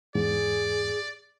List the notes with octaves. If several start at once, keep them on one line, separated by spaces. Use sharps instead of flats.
E2 G#2 G#4 D5